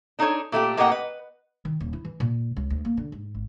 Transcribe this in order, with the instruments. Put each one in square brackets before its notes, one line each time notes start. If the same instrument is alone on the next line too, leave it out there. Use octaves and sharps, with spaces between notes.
[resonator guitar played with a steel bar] D4 D#4 G#4 A4 C#5
A#2 A3 E4 G4
A2 A#3 G4 D#5 F#5 G5
B4
[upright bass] D#3
D#1
E4
E3
A#2
C#2
D2
A#3
D3
G#2
G#1